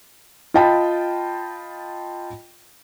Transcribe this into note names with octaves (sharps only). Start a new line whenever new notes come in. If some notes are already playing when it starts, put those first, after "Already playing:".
F4 D#5 G5 A5 B5